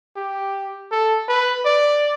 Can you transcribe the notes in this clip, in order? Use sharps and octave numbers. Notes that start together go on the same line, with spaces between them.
G4
A4
B4
D5